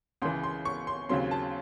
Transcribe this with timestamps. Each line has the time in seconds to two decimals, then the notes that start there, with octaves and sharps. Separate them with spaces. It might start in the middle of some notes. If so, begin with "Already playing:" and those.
0.22 C#2 C#3 E3 C6
0.43 C6
0.65 C#6
0.87 C6
1.09 D#2 C#3 F#3 C4 C6
1.31 A5